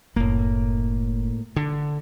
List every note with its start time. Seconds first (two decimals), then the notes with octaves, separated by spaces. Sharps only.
0.16 F#1 A2 A#3
1.56 D3